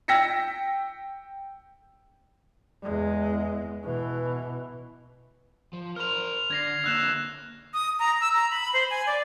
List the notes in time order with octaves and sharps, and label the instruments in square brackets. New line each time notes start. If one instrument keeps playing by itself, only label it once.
[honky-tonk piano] G5 E6 A#6 B6 C#7
[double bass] E2 G#3
B2 E3
[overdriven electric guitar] F3
[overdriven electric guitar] A#4 C5 [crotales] F6 F7
[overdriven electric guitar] D3 [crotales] G#6 A#6 C7
[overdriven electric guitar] D3 A#3 [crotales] E6 F#6 E7
[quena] D#6
A#5
E6
A#5
B5
C5
G#5
D5